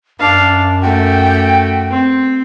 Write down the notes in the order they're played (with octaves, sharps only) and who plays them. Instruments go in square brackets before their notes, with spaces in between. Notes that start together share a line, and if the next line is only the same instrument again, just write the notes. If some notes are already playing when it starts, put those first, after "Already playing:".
[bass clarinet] F#2 [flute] D4 [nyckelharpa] F5
[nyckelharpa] A3 F#4 [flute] G5
[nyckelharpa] C4